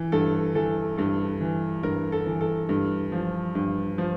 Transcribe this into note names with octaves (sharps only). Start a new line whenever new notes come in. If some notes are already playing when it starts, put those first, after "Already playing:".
Already playing: E3
G2 A4
E3 A4
G2 A4
E3
G2 A#4
A4
E3
A4
G2
F3
G2
F3